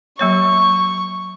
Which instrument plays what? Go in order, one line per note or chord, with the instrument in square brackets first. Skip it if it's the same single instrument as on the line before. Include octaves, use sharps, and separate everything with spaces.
[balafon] F#3 A#3 C#5 [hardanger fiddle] C#6